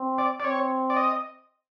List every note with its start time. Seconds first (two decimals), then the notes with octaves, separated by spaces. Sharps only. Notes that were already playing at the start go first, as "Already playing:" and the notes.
Already playing: C4
0.18 D5
0.40 D5
0.44 C4 C#5
0.90 D5
0.97 D#5